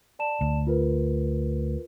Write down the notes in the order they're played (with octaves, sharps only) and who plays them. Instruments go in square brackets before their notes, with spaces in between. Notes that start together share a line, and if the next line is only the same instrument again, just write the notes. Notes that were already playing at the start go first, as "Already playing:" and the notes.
[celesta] D5 A5 E7
[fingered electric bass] D2
[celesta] F4 A#4 B4